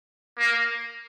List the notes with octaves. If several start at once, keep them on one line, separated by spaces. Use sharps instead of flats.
A#3